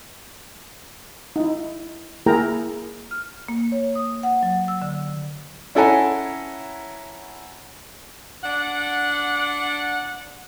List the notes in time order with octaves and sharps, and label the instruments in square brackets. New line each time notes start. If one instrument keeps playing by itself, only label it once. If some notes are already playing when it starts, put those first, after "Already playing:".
[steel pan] D#4 E4
A#3 E4 G#4 A#4 G5 A#5
[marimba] F6
A#3
C#5
D#6
F#5
F#3
E6
D3
[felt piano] C#4 E4 A4 F#5 G#5 A#5
[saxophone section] D4 F#5